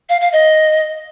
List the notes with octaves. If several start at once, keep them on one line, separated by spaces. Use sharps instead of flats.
F5
F5
D#5